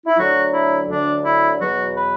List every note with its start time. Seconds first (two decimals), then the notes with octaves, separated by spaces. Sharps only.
0.06 E4
0.18 D2 D3 F#3 F#4
0.53 E4
0.89 D2 D3 F#3 D4
1.25 E4
1.60 E2 B2 F#3 F#4
1.96 B4